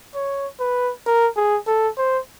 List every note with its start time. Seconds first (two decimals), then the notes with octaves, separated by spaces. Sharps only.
0.15 C#5
0.60 B4
1.06 A#4
1.36 G#4
1.67 A4
1.97 C5